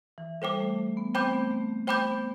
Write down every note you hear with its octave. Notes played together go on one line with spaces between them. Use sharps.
E3
G3 A4 C5 G5 D6
A3
A3
B3
C4 C5 G5 B5 D6 G6
A3
B3
A3
A3
A3 C5 G5 B5 D6 G6
B3